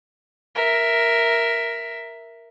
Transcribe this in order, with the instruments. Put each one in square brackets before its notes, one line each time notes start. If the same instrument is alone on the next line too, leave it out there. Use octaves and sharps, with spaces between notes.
[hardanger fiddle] A#4 E5